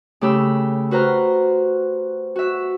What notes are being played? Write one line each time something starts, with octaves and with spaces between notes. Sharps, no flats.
C#3 A3 G4 B5 E6
F#4 B4 C5 A#5 F6
F#4 E5